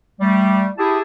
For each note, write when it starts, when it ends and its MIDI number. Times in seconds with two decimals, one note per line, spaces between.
0.20 0.66 55
0.20 0.66 57
0.78 1.00 64
0.78 1.00 67
0.78 1.00 68
0.78 1.00 81